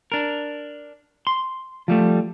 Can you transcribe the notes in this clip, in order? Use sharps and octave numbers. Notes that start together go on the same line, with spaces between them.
D4 A#4
C6
F3 G3 A3